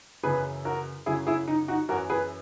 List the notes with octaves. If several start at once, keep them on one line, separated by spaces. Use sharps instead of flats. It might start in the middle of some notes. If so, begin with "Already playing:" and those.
F#2 C#3 E3 G#4 B4
F#4 A#4
F#2 C#3 F#3 E4 G#4
E4 G#4
D#4
D#4 F#4
F#2 E3 F#4 A#4
G#4 B4